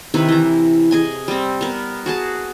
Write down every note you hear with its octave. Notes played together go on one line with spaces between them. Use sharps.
C3 D#3 E4 B4
E3 A#5
G#4 D#5 G#5
G3 C4
B3 A#4
F#4 G#4 A5